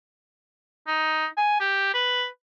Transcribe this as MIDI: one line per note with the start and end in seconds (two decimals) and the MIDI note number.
0.87 1.26 63
1.37 1.57 80
1.60 1.93 67
1.94 2.26 71